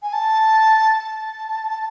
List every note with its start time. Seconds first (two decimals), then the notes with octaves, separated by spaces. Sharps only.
0.03 G#5
0.13 A5
0.98 A5